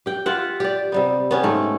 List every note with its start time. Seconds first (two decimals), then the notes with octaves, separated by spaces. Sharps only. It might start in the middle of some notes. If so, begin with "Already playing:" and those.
0.06 G4 G5
0.26 F4 G4 E5 F#5
0.60 G4 D5
0.92 C3 G3 B3
1.31 B3 C#4 G4
1.43 G#2 A3